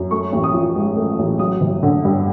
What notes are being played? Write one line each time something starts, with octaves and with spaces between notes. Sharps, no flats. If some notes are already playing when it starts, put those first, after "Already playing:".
Already playing: F#2
A3 C#6
A1
D#6
F3
G#2
A3
A1
F#3 D#6
G1
D3
G2